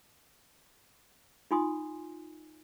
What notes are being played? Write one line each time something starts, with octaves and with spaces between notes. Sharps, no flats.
D#4 F4 G#5 C6 D#6